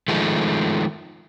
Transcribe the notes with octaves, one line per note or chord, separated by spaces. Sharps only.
D#3 F3 G#3 A3